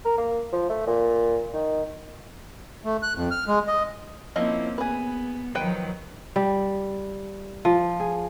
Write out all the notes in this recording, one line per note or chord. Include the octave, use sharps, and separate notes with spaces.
A#4
A#3
F3
A3
A#2
D#3
A3
F#6
F2
F6
G#3
D#5
F3 A#3 C4 C#4 E4 D#5
B3 G#4 B4
D#3 F3 F#3 B4 G5
G3
F3
G#4